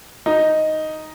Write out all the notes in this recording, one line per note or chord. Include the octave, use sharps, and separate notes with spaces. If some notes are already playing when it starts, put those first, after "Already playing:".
D#4